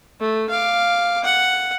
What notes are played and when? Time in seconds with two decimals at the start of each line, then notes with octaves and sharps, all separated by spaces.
0.20 A3
0.49 F5 D6
1.24 F#5